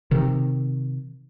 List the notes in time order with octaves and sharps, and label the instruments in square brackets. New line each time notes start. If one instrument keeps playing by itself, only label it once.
[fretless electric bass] C3 D#3